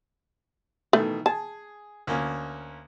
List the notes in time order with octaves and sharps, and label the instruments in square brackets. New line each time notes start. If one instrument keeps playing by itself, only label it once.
[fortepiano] B2 D#3 E3 [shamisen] A3
[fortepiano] G#4 [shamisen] A5
[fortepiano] D2 A#3 C#4